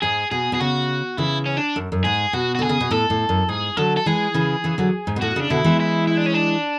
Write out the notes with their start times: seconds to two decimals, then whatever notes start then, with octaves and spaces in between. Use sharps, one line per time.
0.02 G#2 G#4
0.31 B2 G#4
0.52 B2 G#4
0.60 C#3 F#4
1.17 C#3 E3 E4
1.46 C#4
1.57 D4
1.76 F#2
1.92 F#2
2.04 G#2 G#4
2.33 B2 F#4
2.55 F#4
2.59 D3 G#4
2.69 C#3
2.80 B2
2.91 A2 A4
3.10 A2
3.29 F#2
3.49 G#2 G#4
3.77 D3 F#3 A4
3.97 A4
4.06 E3 G#3 G#4
4.34 C#3 E3
4.64 C#3 E3
4.78 D3 F#3
5.07 G#2
5.16 B2
5.21 A2 F#4
5.36 C#3 D4
5.50 B2 D3 E4
5.64 E3 G#3
5.80 E4
6.07 E4
6.17 D4
6.26 C#4
6.34 D4